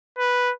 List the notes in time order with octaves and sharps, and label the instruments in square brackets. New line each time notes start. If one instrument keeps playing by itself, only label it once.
[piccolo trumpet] B4